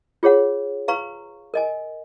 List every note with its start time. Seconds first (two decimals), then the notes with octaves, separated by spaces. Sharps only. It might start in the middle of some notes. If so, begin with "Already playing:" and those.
0.23 F4 G#4 C#5 F#5
0.88 B4 F5 A#5 C#6
1.54 A#4 D#5 G#5